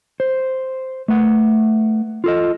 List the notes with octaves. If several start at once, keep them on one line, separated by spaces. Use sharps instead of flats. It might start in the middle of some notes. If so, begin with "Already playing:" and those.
C5
A3 B4 F#5
F4 A4 D#5